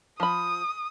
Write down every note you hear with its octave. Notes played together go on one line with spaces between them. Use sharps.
F3 B5 D#6